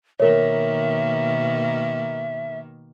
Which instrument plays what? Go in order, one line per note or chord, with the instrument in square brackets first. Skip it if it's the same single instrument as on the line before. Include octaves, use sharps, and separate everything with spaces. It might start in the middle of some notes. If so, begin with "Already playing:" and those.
[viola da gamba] B2 D#3 A#3 [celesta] A#4 C#5 [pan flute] E5